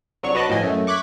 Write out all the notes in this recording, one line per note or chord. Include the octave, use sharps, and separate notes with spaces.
C2 F#3 D4 C#5 C#6
F#4 B4 D#5 A5 D6 F#6
G1 A2 F3 D#5 G#5
F#2 A3
C#6 D6 F#6 G#6 B6